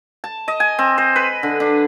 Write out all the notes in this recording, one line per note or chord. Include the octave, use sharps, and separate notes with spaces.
A5
D#5
G#5
C4
C5
B4
D3
D4